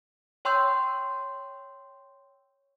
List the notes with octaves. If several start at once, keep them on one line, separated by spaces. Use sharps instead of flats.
C#5 G5 C6 C#6 E6 G6